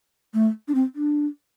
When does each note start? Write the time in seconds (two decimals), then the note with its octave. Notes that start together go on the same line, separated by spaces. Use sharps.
0.34 A3
0.68 D4
0.75 C4
0.95 D4